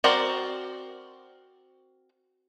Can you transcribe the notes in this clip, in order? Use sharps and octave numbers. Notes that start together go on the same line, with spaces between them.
C4 F#4 A#4 C5 D5